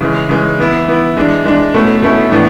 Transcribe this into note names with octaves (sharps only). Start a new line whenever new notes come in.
C#3 E3 G#3
C#3 E3 G#3
E3 B3 E4
E3 B3 E4
E3 G#3 D4
E3 G#3 D4
B2 A3 C#4 E4
B2 A3 C#4 E4
A2 E3 B3 D4